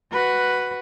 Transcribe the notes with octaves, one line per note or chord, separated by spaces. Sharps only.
F#4 B4